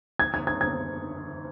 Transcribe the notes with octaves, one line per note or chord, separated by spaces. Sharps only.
G#6
G#6
G#6
G#6